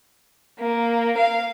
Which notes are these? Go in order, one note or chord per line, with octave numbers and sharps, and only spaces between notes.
A#3
F5